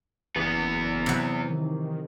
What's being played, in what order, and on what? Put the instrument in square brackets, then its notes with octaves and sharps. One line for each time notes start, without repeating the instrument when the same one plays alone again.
[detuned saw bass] F#1 [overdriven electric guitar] E2 B3 [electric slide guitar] E3 G#4
[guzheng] C3 F#3
[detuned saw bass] D#3